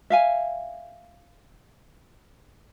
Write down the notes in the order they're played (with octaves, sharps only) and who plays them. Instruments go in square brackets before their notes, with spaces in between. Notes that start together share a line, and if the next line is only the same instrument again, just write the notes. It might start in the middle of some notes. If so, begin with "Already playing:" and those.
[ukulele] E5 F5 G#5